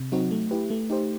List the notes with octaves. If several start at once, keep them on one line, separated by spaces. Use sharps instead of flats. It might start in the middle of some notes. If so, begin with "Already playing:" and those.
Already playing: C3
F#3 C4 D#4 F#4
A3
E4 G4 B4
A3
D#4 G4 C5